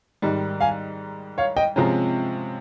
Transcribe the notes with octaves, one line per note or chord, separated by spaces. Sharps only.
G#2 D#3 G3
F5 G#5
C#5 F5
D#5 G5
C3 F3 G#3 C#4 G5 A#5